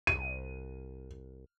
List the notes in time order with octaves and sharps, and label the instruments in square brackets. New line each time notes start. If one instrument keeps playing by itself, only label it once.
[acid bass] C2 [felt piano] D#7